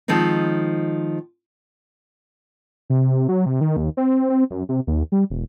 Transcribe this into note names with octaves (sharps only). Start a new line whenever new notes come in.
D#3 F3 G#3 C4 D#4
C3
F#3
C3
D#3
D#2
C4
C4
F#2
C3
D#2
G3
E1